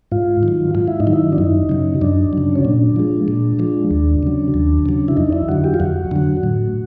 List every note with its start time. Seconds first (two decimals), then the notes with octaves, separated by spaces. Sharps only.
0.12 G#2 F4
0.43 D#3
0.48 F#3
0.75 G#2 F4
0.88 E4
1.00 D#4
1.07 D#3 F#3
1.13 E4
1.32 D4
1.38 F#2 D#4
1.69 C#3 F#3
2.01 F#2 D4
2.33 C#3 F#3
2.55 C#4
2.65 A#2 D4
2.96 F3 G#3
3.28 A#2
3.59 F3 G#3
3.91 D#2
4.23 C#3 F#3
4.54 D#2
4.86 C#3 F#3
5.08 E4
5.17 F2 D#4
5.33 E4
5.48 D3 F#3 F#4
5.64 G4
5.74 F4
5.80 F2 F#4
6.11 D3 F#3
6.43 A2